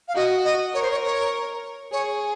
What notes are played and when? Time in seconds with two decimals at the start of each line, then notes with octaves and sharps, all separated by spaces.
0.08 F5
0.15 F#4 D#5
0.45 D#5
0.74 A#4 C#5
0.83 C5
0.91 C#5
1.04 C#5
1.92 G#4 C#5